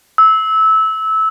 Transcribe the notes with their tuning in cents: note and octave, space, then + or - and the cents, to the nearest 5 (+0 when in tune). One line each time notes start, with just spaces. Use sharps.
E6 -20